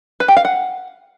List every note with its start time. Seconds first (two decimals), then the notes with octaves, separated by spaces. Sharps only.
0.20 B4
0.28 G4
0.37 F5
0.45 F#5